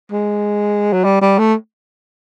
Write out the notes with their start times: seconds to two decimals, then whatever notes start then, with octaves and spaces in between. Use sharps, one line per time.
0.12 G#3
0.93 F#3
1.05 G3
1.21 G3
1.39 A3